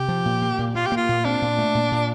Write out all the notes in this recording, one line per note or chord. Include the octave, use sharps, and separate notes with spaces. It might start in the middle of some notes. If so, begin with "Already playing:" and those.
Already playing: C3 G4
F3
A#2
A#3
A#2
A#3 F4
G4
A#3
F4
A#2
C4 D4
A#2
A3
A#2
A#2